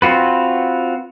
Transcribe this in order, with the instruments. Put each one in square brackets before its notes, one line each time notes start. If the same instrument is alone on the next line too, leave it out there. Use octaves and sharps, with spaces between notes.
[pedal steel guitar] C4 F4 F#4 B4